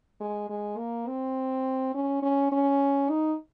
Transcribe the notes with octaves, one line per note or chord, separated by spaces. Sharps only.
G#3
G#3
A#3
C4
C#4
C#4
C#4
D#4